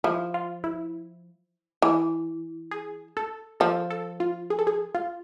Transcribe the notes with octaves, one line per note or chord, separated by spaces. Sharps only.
F3 E4
F4
E4
E3
G#4
A4
F3 A4
A4
F4
G#4
A4
G#4
F4